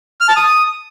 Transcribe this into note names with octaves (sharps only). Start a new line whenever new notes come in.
F6
A5
D#6